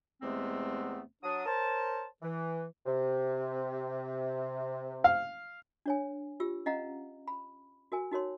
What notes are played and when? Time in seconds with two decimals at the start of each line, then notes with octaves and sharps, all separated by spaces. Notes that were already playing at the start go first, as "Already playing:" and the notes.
0.22 E2 C3 G#3 A3 B3 C4
1.23 F#3 D4 D#6
1.46 A#4 C5 C#5 A5
2.22 E3
2.86 C3
5.04 F5
5.86 D4 C#5 G#5
6.40 F4 G4 E6
6.66 C#4 D#5 F5 F#5 A#5
7.28 B5
7.92 F#4 A#4 G#5
8.11 D#4 F#4 A#4 C#5 C6